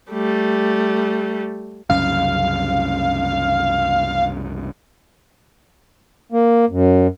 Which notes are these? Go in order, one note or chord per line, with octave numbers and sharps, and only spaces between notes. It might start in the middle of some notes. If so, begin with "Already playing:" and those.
G3 A3
C2 F#2 C#3 F5
A#3
F#2